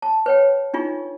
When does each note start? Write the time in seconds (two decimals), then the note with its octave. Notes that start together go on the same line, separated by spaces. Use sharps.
0.02 A5
0.26 B4 C#5 G5
0.74 D4 D#4 F4 G#4